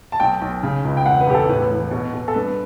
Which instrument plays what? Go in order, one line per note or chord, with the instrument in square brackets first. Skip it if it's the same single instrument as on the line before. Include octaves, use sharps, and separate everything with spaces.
[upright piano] A5
B1 G5
B1
C#3
C#2
G5
E1 F#5
B4
E1 G4
A4
A2 B4
E3
B2
B2
A4
G2 B4